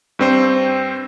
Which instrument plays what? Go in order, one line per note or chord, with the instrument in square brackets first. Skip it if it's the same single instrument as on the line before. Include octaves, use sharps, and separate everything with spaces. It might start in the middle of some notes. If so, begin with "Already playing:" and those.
[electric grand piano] G2 C4 C5